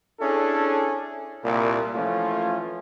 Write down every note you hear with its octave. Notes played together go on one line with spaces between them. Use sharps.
C#4 D4 E4 G#4 A4
C2 A#2
E3 F3 A3 C#4 F4